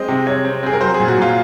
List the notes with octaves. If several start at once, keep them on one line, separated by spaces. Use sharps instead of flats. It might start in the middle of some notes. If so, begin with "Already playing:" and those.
Already playing: G#3 C4 D#5
C3
C3 C#5
C4
C4 G#4
A#4
F#3 C5
G#4
A#2
F#4
A#2 F4